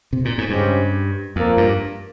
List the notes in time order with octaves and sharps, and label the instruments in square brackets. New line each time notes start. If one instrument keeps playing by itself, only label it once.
[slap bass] C3
A#2
G#2
[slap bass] G2 [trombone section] C#3 G#3 C#4 G4 C5
[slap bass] F2 [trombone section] A#2 F3 A#3
[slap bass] G2